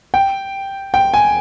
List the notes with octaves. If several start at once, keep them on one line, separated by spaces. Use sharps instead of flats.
G5
G5
G#5